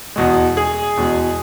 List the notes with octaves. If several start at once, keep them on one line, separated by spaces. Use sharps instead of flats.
E2 B2 G#3
G#4
E2 B2 G#3